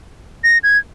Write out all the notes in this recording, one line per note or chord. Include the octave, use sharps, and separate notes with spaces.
A#6
G#6